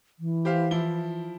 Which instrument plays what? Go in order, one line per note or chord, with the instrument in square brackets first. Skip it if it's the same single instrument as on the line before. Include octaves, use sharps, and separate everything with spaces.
[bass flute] E3
[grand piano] G4 C5 F5
F3 E4 G7